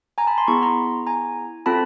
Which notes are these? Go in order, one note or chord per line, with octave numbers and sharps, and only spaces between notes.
G#5 A#5
A5 B5
A#5 C6
B3 E4 G#4 B5 C#6
A#5 C6
G#5 A#5
C4 F4 A4 A5 B5